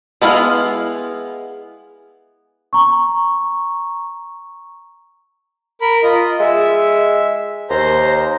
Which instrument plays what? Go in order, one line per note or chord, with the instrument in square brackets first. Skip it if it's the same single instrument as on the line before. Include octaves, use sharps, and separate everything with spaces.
[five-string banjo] G#3 B3 E4 F#4 F5
[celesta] A#5 C#6
[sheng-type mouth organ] A#4 B5
F4 D#5
[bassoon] G#3 [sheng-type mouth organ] E5
[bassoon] D#2 [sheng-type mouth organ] C5 A#5